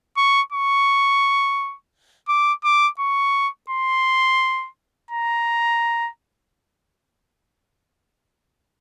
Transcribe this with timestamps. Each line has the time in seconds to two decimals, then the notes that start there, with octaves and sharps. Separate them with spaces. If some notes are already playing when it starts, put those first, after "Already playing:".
0.17 C#6
0.52 C#6
2.29 D6
2.64 D6
2.99 C#6
3.70 C6
5.11 A#5